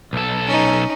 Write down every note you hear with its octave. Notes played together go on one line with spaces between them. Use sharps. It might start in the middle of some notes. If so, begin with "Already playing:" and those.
B1 A4
C#4 D#4